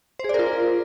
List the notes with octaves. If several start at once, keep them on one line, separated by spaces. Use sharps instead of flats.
F4 G#4 A#4 C5 D5